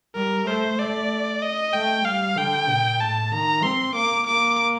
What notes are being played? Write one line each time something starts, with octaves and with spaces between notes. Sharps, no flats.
G3 A#4
A3 C5
A3 D5
D#5
A3 G5
G3 F5
D3 G5
A#2
A2 A5
D#3 A#5
C4 C6
A#3 D6
A#3 D6